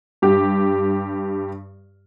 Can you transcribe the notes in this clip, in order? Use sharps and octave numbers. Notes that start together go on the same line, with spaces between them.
G2 G4